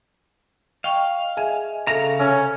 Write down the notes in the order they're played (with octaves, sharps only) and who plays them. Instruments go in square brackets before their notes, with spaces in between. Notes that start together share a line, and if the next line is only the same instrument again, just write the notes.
[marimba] D#5 G5 C#6 [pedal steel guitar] F5
[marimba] G#4 D#5 E5 [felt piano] G#5
[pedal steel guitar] C#3 F5 A#5 [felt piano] A4 A#6 [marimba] E5
[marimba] C3 [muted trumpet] C#4